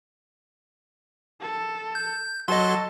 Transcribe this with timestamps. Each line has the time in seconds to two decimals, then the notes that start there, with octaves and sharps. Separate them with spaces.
1.41 A4
1.95 G6
2.48 F#3 A4 D#5 C6